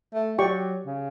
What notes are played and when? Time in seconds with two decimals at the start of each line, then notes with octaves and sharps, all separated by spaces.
0.14 A3
0.38 F#3 G4 D5 G5 C#6
0.86 C#3